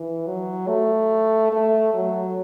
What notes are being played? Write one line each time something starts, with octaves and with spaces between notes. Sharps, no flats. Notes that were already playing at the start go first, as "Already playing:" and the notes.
Already playing: E3
F#3
A3
A3
F#3